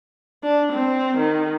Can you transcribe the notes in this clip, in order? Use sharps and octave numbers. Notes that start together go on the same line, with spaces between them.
D4
C4
D#3